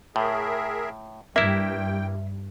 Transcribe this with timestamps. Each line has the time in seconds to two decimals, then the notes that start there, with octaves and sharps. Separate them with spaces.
0.16 A2 G#4 A#4 E5
1.36 G2 A#3 E4 E5 G5